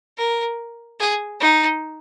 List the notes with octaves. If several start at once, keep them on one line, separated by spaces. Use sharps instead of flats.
A#4
G#4
D#4